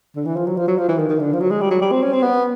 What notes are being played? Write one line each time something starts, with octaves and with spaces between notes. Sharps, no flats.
D3
E3
F3
F#3
F3
F#3
F3
E3
D#3
D#3
D3
F3
F#3
G#3
G3
F#3
G3
C4
C#4
C4
B3